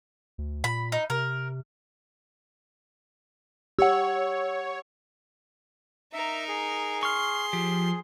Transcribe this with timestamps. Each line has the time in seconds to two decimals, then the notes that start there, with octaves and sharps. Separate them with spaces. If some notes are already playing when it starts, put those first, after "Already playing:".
0.38 D2
0.64 A#2 B5
0.92 D#4
1.10 C3 A#4
3.79 G4 C#5 F#5 E6
6.13 D#4 A#4 E5
6.48 G#4
7.03 C6 C#6 F6
7.53 F3 G4